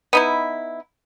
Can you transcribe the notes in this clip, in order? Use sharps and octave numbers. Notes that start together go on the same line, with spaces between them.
B3 D#4 E4